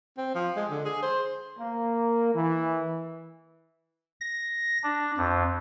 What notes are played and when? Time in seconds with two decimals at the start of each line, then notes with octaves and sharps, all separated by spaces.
0.18 C4
0.35 F3
0.56 G#3
0.71 D3
0.85 G#4
1.03 C5
1.59 A#3
2.34 E3
4.21 A#6
4.83 D4
5.17 F2